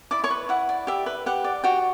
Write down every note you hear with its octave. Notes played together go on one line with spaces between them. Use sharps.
E4 D5 D6
C#5 C#6
B4
E4 F#5
D5
G4 E5
B4
G4 F#5
D5
F#4 G4 G5